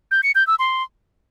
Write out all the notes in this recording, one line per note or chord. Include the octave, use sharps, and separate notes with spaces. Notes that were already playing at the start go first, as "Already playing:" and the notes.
G6
C#7
G6
E6
C6